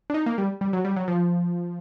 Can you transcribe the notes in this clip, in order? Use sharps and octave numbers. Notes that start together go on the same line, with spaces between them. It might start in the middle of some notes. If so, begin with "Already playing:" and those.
D4
D#4
A#3
G3
G3
F#3
G3
F#3
F3